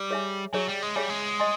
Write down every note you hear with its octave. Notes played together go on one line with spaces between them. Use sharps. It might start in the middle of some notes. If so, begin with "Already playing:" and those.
Already playing: G3
G#4 C#5 E5 G#5
F#3 G#4 C#5 E5 G#5
G3
G#3
G3 G#4 C#5 E5 G#5
G#3
D#5 G#5 C6